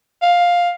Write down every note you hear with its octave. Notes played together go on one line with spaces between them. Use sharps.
F5